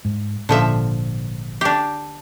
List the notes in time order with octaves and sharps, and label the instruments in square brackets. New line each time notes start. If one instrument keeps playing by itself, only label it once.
[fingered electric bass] G#2
[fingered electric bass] G#1 A#2 [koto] D3 F3 E5
[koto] D4 G4